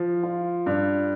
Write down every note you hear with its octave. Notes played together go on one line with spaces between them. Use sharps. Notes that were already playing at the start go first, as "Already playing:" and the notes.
Already playing: F3
F4
G2